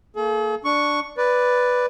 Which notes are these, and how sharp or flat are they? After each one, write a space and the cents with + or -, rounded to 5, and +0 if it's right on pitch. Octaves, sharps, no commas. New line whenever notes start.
A#3 -25 G#4 +45
D4 +0 C#6 +0
B4 +0 D5 +0